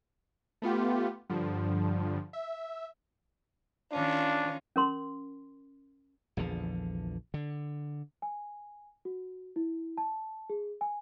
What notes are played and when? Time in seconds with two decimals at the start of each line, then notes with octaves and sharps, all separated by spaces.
0.62 A3 B3 F4 G4
1.30 G2 D3 F3
2.33 E5
3.92 D#3 C#4 D4 F4
4.76 C#4 A#4 C6
6.37 A#1 E2 D3 F3
7.34 D3
8.22 G#5
9.05 F#4
9.56 E4
9.97 A5
10.50 G#4
10.81 G#5